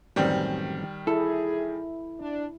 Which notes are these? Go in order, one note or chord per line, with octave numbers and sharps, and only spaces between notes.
A1 F#2 D#3 G3 C4
E4 G#4 A4
D4